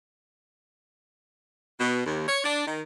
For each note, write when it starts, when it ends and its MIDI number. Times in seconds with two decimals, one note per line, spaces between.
1.80 2.06 47
2.06 2.24 39
2.28 2.41 73
2.44 2.65 62
2.66 2.81 51